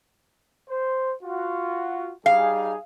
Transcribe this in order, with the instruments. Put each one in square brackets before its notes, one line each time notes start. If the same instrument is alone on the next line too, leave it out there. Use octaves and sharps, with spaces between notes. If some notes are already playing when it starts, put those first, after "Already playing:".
[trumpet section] C5
F4 F#4
[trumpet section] G3 D#4 G#4 [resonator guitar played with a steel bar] F5